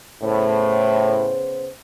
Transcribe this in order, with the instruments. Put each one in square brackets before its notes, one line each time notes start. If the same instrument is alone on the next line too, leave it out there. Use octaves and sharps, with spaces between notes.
[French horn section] A2 [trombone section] C#3 B3 C5